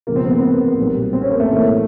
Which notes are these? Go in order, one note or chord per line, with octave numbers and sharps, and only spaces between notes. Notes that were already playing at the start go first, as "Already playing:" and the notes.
C#2 C3 F3 G#3 A#3
C4
B3
C4
B3
B1 A#2 G3
C4
C#4
A#3
A3
A1 A2 E3